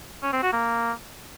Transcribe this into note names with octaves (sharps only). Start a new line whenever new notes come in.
C#4
C4
F#4
A#3